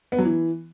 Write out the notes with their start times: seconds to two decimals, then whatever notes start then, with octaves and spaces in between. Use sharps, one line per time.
0.12 B3
0.18 F#3
0.25 E3